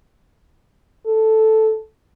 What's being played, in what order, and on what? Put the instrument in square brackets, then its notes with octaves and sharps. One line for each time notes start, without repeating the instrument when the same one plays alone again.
[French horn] A4